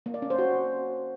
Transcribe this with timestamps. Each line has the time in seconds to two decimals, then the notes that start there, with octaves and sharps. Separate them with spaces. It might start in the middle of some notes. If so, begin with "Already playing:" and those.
0.06 A#3
0.14 D5
0.22 C#4
0.30 C5
0.38 F#4